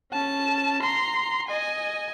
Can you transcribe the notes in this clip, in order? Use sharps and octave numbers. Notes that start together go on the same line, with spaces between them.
C#4 A5
A#5 C6
D#5 G#5